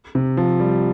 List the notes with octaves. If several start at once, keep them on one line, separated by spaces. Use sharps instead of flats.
C3
F3
G3